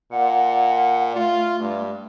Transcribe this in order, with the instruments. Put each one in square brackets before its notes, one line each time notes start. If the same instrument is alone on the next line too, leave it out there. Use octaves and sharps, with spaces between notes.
[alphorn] A#2 [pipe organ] F#5
[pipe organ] A3 [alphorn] F4
[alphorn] G2